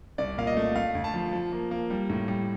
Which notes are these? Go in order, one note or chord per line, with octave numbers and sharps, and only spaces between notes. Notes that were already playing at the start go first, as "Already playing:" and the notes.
C2 D5
A#2 F5
D#5
A3
A3 F5
D2
A5
F3
F3
A#3
A#3
G3
A2
G3